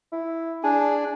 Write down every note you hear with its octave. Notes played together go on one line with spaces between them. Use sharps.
E4
D4 G#4